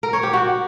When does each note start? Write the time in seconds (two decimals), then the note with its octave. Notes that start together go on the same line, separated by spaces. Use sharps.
0.03 A#4
0.13 C#5
0.23 G4
0.33 F#4